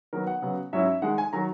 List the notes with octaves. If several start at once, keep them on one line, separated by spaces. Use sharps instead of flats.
D#3 F#3 B3 A#4
F#5
C#3 F#3 B3
G#2 F#3 C#4 E4 E5
D#3 G#3 D#4 F#5
G#5
D#3 F#3 A#5